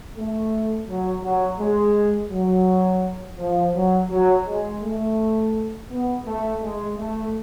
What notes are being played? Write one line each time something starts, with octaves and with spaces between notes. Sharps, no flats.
A3
F#3
F#3
G#3
F#3
F3
F#3
F#3
G#3
A3
B3
A3
G#3
A3